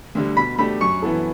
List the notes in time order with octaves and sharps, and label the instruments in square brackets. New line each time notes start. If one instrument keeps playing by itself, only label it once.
[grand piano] D2 D3 G3
[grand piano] B2 [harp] B5
[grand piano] A3 D4 G4 [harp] B5
[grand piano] F#2 [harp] C#6
[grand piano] E3 B3 E4 A4